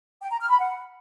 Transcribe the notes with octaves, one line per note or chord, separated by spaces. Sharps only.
G5
A#5
F6
B5
F#5